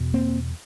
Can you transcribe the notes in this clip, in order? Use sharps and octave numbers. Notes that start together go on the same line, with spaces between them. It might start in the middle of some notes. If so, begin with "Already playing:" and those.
Already playing: E2 B2
A#3 C4